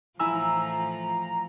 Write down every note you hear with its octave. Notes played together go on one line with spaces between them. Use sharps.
A2 E3 F3 E4 G#5 A#5 E6